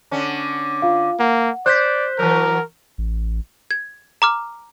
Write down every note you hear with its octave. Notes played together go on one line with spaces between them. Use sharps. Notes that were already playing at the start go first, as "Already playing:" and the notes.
D3 C#4
F4 F5
A#3 F#5
C5 D5 F#6 G6 B6
E3 F#3 A#4
A1
G#6
A#5 D6 F6